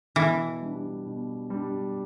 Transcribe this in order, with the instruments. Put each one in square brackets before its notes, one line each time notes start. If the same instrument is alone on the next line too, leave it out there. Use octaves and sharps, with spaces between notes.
[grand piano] B2 [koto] E3
[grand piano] G3 D4
B2
G3 D4